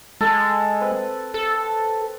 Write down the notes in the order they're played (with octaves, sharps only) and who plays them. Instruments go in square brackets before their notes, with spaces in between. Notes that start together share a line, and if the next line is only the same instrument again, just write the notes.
[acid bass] G#3 [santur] A4
[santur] C4 B4
[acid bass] A4